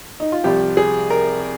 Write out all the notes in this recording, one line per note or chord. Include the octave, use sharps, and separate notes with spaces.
D#4
F4
C2 C3 F3 G4
G#4
A#4